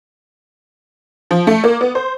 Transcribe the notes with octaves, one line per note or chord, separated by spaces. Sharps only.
F3
A3
A#3
B3
C5